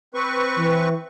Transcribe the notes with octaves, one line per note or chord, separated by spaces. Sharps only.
C4 B4 C#6
E3